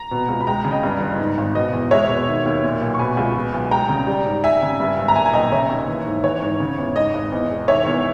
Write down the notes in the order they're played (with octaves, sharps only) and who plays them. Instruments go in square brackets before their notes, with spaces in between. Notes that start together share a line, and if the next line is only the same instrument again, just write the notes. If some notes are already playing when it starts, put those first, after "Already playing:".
Already playing: [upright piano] A#5
[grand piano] B2
C#2
[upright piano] B5
[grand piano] G#3 [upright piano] G5 A#5
[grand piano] C#3
[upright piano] D#5 G5
[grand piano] G2
G1
G#2
G#1
[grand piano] B2 [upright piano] D#5
[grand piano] E2
[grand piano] G#3 [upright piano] C#5 E5
[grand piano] B2
D#3
D#2
A#2
B1
[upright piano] C#6
[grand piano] B2 [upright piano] G#5 B5
[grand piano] C#2
B2
B1
[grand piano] G#3 [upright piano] G5 A#5
[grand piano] C#3
G3
G#2
[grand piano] G3 [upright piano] E5 G#5
[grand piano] C#3
G2
G#1
[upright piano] A#5
[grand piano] A#2 [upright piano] E5 G#5
[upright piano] G#5
[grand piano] B1 [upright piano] D#5 G5
[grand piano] C#3 [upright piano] C#5 E5
[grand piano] D#2
E3
G#2
[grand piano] E3 [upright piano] C#5
[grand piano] G#2
C#3
E2
[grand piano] G#2 [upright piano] D#5
[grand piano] G#1
E2
E1
[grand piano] D#3 [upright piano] C#5 E5
[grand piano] E2